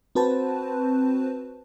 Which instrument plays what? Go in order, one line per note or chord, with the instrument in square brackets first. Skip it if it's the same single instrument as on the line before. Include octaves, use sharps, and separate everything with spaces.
[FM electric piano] C4 F#4 B4 C5 A5